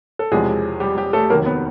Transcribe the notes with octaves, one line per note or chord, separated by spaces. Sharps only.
A4
E1 E2 C3 F3 G#3 G#4
G3 G4
G3 G4
A3 A4
F1 D#2 D#3 F#3 A#3 A#4
B3 B4